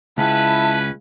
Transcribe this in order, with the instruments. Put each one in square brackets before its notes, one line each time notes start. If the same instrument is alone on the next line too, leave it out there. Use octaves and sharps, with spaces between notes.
[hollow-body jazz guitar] C#2 [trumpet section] C#4 B4 [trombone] E4 [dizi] A5